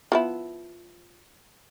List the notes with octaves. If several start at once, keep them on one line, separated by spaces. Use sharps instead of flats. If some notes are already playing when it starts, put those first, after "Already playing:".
F3 B3 E4